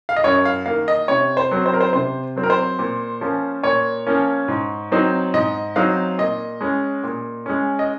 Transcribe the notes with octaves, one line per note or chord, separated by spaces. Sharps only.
F5
D#5
F#2 C#5
F5
D#3 A#3 F5
D#5
C3 C#5
C5
F#3 C4
C5
A#4
C5
C3 C5
F#3 C4
A#4
C5
A#2
F3 A#3 C#4
A#2 C#5
F3 A#3 C#4
G#2
F#3 C4 D#4
G#2 D#5
F#3 C4 D#4 F5
A#2 D#5
G#3 C#4
A#2
G#3 C#4
D#5